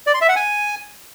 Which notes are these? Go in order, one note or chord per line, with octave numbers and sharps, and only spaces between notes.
D5
C6
E5
F#5
G#5